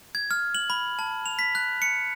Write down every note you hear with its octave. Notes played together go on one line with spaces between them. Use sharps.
G#6
F6
F#7
B5
A5
F7
B6
F#6
C#7